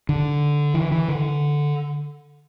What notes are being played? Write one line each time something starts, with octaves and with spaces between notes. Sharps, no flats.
D3
E3
E3
D3